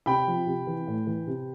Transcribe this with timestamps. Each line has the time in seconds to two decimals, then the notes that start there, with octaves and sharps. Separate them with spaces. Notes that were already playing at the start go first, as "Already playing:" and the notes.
0.06 C3 G5 B5
0.27 F3
0.46 C3
0.67 E3
0.87 A2
1.07 E3
1.27 C3